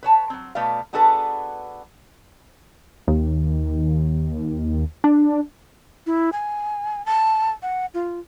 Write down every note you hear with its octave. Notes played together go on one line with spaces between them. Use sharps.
B4 C#5 A5
F#3 C4
B2 A3 B4 D5 F5
B3 D4 F#4 G#4 A4 B4
D#2
D4
E4
G#5
A5
F#5
F4